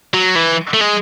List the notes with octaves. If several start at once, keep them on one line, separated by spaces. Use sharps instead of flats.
F#3
E3
A3
G#3